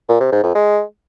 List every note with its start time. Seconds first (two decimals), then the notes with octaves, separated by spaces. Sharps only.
0.09 A#2
0.20 C3
0.32 G#2
0.43 F2
0.55 G#3